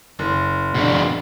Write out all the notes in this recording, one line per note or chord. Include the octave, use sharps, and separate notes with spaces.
F#1
B2 D4